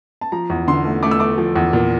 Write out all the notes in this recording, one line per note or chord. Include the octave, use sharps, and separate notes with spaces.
A5
F3 A#5
E2
D3 C6
A3
A3 D6
E6
A3 D6
F3
E2
A#2